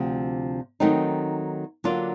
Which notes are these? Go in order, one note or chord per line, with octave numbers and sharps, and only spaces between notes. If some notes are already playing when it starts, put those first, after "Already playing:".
Already playing: D2 C3 F3
D#3 F#3 A3 C4 D#4
D3 F#3 A#3 D4 F4